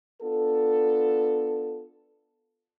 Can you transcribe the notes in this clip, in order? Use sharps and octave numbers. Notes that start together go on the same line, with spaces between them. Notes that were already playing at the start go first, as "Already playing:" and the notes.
B3 D4 F4 A4